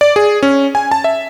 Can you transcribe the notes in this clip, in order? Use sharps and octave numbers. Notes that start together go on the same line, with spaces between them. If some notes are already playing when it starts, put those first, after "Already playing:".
D5
G#4
C#4
G#5
A5
E5